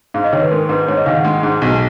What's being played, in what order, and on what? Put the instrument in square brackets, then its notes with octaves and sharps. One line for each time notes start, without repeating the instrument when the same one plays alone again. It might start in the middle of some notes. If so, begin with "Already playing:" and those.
[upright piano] G#2 [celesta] F5
[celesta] D#5
[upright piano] D#3 [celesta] C#5
[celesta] B4
[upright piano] G#3 [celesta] A#4
[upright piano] G#2 [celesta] B4
[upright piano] G#2 [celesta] C#5
[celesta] D#5
[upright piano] D#3 [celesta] F5
[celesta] F#5
[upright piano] G#3
G#2
[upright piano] B1 [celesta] G#5